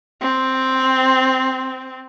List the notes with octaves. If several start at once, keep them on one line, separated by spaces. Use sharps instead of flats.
C4